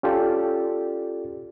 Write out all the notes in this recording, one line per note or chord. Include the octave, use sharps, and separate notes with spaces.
C#4 F4 G4 A4 D5